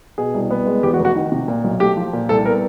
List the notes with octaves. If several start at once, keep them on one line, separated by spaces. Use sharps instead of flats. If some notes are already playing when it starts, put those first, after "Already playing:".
B2 G#4
C2
B3
G#3
E2 G4
F#4
F1
F#4
D#3
C3
A#2
B1
A3 G4
F3
A#2
C2 A4
B3 A#4